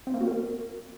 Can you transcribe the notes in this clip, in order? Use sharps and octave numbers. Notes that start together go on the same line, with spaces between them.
C4
A#3
F#4
A#4